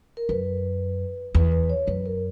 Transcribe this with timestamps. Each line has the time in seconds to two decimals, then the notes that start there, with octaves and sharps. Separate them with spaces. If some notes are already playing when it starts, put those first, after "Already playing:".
0.17 A#4
0.29 F#2 B4
1.35 E2 B4
1.52 B4
1.70 C#5
1.87 F#2 B4
2.06 A#4